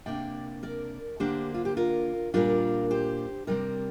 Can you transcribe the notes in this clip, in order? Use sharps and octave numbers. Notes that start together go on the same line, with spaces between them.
C3 A#3 D4 D5 G5
A#4 D5
D3 A#3 D4 G4 C5
F4
G4
F4 A#4
A#2 G3 D4 F4 A#4
G4 C5
C3 G3 C4 A#4 D5